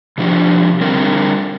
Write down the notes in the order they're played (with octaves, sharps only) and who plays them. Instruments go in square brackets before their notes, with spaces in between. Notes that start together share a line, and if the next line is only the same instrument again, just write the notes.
[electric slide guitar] C3 F3 D4 G4
D3 G3 C4 A#4